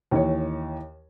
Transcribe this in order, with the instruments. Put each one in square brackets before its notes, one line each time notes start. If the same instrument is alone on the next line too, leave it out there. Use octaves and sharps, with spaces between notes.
[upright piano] D#2 E3 C#5